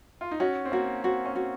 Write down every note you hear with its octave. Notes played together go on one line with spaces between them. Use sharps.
F4
D#4
C#4 F#4
C4
A#3 F#4
C4 F#4
C#4
F#4